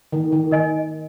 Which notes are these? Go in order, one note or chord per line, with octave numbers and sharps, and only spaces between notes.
D#3
D#3
D#3 A#4 D#5 G#5